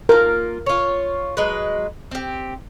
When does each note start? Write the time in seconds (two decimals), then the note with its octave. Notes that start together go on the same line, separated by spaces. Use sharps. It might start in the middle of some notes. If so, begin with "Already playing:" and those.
0.09 A#3 F4 A#4
0.66 F4 C#5
1.37 F#3 G#3 B4
2.11 C4 G4